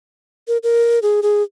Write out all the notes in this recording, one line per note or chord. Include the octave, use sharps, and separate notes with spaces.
A#4
A#4
G#4
G#4